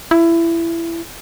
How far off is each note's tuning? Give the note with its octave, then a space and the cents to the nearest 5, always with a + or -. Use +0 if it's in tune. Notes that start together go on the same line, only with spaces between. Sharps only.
E4 +20